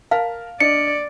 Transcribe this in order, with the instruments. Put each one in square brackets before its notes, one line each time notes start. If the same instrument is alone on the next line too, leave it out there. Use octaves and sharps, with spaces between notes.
[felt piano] A#4 A5 F6 [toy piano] F5
[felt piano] D4 D#5 [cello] D5 [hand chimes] C#7